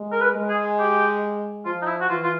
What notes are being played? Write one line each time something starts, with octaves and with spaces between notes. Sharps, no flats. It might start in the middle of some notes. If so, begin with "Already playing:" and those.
Already playing: G#3
A#4
B4
G#3
G#4
G4
F3 F4
D#4
E4
F#4
E3 F4
F4